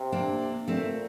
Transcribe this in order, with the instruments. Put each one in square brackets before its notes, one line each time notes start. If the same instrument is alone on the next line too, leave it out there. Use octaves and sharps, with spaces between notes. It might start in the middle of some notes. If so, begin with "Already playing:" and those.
Already playing: [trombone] C3
[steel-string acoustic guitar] A#3 D4
[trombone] A#2 [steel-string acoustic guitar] A3 C4